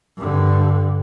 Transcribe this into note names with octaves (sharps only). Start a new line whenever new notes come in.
G2 D3